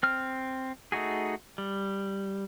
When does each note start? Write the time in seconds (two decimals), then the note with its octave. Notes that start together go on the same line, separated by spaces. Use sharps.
0.03 C4 F6
0.92 A3 D#4 F#4 G#4
1.58 G3